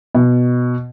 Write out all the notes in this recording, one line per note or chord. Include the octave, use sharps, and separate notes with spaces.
B2